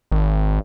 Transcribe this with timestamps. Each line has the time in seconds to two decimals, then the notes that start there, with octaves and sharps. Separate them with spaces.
0.12 G#1